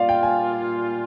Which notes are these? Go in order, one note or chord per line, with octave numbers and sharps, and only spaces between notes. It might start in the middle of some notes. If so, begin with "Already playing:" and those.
Already playing: A#2 G3 A#3 F4 D5 F5
G5
G#5